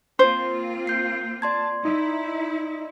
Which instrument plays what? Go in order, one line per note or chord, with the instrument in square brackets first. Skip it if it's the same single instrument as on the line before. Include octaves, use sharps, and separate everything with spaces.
[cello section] A#3 C4 F4 [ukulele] C5
[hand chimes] G6 C7
[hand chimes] D5 C6 G#6 [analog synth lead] A5
[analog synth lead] D#4 [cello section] E4